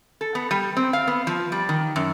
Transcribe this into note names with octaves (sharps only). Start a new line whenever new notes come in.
A4
B3
G3
C4
F5
B3
F3
G3
D#3
F#2